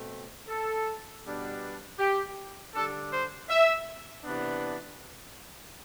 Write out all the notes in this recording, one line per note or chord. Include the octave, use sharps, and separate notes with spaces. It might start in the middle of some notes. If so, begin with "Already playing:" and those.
Already playing: B2 A3 C4
A4
B2 G3 B3 D4
G4
D3 G3 D4 A4
C5
E5
C3 E3 B3 D4